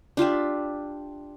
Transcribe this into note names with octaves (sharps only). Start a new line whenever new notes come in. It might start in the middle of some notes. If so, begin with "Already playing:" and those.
D4 F4 G4 E5